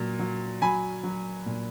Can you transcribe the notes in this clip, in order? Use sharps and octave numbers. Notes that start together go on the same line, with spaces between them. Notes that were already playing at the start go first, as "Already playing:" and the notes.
Already playing: A#2 F#3
F#3
F#3 G#5 B5
F#3
A#2